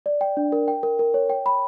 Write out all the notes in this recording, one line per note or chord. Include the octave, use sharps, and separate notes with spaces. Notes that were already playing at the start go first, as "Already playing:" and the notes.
D5
G5
D4
A#4
G5
A#4
A#4
C#5
G5
B5